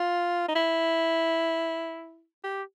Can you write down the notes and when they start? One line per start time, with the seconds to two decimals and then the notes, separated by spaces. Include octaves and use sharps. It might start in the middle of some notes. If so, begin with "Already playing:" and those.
Already playing: F4
0.48 D#4
0.56 E4
2.44 G4